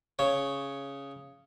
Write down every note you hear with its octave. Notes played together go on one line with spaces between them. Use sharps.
C#3 C#5